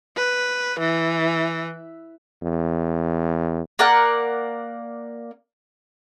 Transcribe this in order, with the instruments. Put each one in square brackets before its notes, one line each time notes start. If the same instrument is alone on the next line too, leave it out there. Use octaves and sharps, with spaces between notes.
[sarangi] B4
E3
[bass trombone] E2
[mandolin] A#3 A#4 D5 F#5